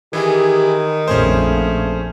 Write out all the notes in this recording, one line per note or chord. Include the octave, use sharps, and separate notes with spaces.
D#3 E3 E4 G4 G#4
A#1 F2 A3 C#4 G#4 C5